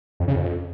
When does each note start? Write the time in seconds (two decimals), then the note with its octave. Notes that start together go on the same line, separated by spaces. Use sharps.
0.20 F2
0.28 C#3
0.36 F2